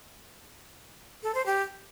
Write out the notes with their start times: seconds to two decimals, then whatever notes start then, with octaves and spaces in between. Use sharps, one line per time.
1.23 A4
1.35 C5
1.46 G4